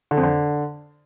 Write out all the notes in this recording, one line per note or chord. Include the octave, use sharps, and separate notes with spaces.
D3
F2
D3